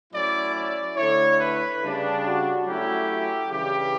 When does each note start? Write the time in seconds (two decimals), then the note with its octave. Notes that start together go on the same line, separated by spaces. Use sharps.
0.12 A2 F#3 C#4 E4 D5
0.54 D5
0.97 D3 A3 E4 C#5
1.39 B4
1.82 C#3 G3 D4
2.24 F#4
2.66 F#3 A3 C#4 E4 G4
3.51 C#3 E3 G3 D4 G4